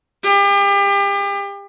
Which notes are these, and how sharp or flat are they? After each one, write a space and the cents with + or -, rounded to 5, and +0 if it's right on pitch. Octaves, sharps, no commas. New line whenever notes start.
G4 +35